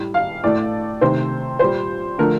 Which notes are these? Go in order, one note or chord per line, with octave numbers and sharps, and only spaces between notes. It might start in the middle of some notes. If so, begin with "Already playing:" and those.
Already playing: A2 G3
F5
A2 A3 D5
C3 D#3 A3 C5
A#2 G3 C5
D3 F3 A3 A#4